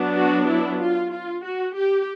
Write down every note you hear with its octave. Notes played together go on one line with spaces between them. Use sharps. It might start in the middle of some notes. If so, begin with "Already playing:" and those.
Already playing: F#3 B3 D4
F#4
E4
F4
F4
F#4
G4